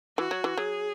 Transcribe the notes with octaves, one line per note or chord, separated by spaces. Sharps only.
E3 F#4
F#3
E3
F#3 G#4